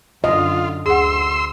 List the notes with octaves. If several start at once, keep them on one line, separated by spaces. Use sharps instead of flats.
F#2 D3 F4 D#5
D2 G#4 F#5 C6 E6